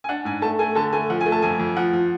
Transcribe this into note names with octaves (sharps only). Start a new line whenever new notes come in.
G#5
D4 F#5
G#2 G#5
A3 A5
A3 G#5
D3 A5
A3 G#5
F3 F#5
G#5
A3
A5
F2 G#5
F2
F3 F#5
F3